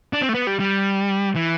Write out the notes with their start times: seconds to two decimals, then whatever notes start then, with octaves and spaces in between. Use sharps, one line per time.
0.13 D4
0.22 C4
0.29 A3
0.34 B3
0.47 G3
0.60 G3
1.35 E3